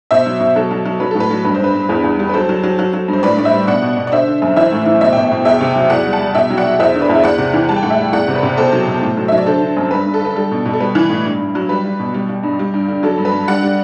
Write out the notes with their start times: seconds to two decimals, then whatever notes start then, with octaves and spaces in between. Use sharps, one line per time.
0.11 B2 C5 E5
0.26 F#3
0.40 B2
0.56 F#3 A4
0.71 F#3
0.85 F#3
1.00 F#3 B4
1.11 A2 A4
1.20 B4
1.31 F#3
1.45 G2 B4
1.54 C5
1.60 G2 B4
1.74 G2
1.89 E2
2.04 E2
2.19 G3
2.29 B4
2.34 F#3 A4 C5
2.49 F#3
2.64 F#3
2.79 F#3
2.93 F#3
3.08 G2
3.13 C5
3.23 A2 B4 D5
3.37 A2 D5
3.45 C5 E5
3.53 G3
3.67 B2 D5 F#5
3.82 B2
3.97 B2
4.07 D5
4.12 D3 C5 E5
4.28 D3
4.42 F#2
4.56 E3 C5 E5
4.72 A2
4.86 E3
5.01 B2 C5 E5
5.13 E5 G5
5.17 B2
5.24 E5 G5
5.32 B2
5.45 E2 E5 G5
5.61 C3
5.75 F#3
5.90 E2 D5 F#5
6.05 G3
6.13 F#5 A5
6.20 G3
6.35 B2 E5 G5
6.50 F#3
6.57 D5 F#5
6.65 F#3
6.79 E2 C5 E5
6.94 D3
7.01 B4 D5
7.09 E2
7.15 E5
7.24 E2 D5 F#5
7.38 C3
7.53 E3
7.69 G3 A5
7.76 G5
7.83 A2 F#5
7.90 E5 G5
7.98 G3
8.13 E2 D5 F#5
8.28 C3
8.35 B4 D5
8.43 C3
8.57 B2 A4 C5
8.73 F#3
8.88 B2
9.02 A2
9.17 F#3
9.28 F#3 E5
9.38 D5
9.46 D3 A4 C5
9.61 D3
9.77 F#2
9.91 G2 B4
10.06 G2
10.14 A4
10.21 D3 B4
10.36 G3 A4
10.51 B2
10.65 B2
10.73 A4
10.80 G3 B4
10.95 E3
11.10 A2
11.25 G2
11.39 G2
11.55 F#3
11.69 G3 B4
11.84 G3
12.00 B2
12.14 G3
12.29 G3
12.43 G2
12.59 G3
12.74 G2
12.88 D3
13.03 F#3 A4
13.18 G2
13.25 B4
13.33 G2
13.48 G3 D5 F#5
13.63 G3